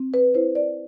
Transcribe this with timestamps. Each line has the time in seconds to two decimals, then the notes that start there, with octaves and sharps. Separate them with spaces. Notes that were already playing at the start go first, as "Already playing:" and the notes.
Already playing: C4
0.14 B4
0.34 E4 C5
0.55 D5